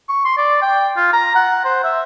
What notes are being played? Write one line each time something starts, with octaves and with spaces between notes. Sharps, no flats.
C#6
C6
D5
G5
F4
A#5
F#5
C5
E5